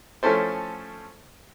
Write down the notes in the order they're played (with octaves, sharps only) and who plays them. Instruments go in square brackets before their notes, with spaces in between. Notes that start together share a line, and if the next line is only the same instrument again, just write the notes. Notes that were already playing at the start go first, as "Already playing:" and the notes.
[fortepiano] F3 A3 C#4 E4 A4 C5